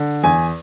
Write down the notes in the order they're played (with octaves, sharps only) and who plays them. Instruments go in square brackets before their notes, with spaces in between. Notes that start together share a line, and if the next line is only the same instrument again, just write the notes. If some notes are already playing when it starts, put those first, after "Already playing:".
Already playing: [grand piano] D3
E2 G#5